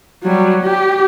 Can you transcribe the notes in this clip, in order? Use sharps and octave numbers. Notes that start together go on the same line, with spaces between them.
F#3 G3
G4